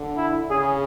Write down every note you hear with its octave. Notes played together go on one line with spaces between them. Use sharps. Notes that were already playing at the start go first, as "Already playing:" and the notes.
Already playing: D3
E4
C#3 G#4